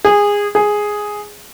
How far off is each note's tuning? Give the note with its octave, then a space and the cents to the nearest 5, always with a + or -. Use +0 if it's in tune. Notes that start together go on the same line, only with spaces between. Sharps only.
G#4 -20
G#4 +0